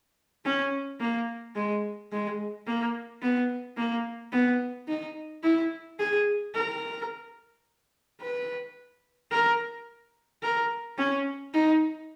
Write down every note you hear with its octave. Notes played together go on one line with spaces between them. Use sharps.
C#4
A#3
G#3
G#3
A#3
B3
A#3
B3
D#4
E4
G#4
A#4
B4
A#4
A#4
C#4
D#4